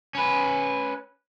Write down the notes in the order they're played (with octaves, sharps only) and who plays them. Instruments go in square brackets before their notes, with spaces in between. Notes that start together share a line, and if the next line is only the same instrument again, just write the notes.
[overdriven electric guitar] C#4 B4